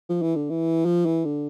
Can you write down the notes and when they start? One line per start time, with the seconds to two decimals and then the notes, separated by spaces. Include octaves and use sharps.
0.09 F3
0.22 E3
0.36 D3
0.50 E3
0.85 F3
1.06 E3
1.25 D3